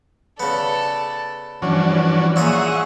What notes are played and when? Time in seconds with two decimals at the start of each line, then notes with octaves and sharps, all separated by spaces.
0.40 C#3 B3 A4 D5
1.62 G2 E3 F3 C#4 D4 F#4
2.36 A#2 A#3 C#4 G#4 E5 F#5 C#6 D#6